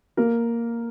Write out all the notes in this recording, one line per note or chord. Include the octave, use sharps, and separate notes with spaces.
A#3 A#4